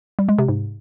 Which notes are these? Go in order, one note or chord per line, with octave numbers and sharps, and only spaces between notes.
G3
G#3
C3
G#2